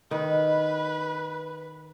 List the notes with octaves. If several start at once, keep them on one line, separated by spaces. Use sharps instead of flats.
D#3 B4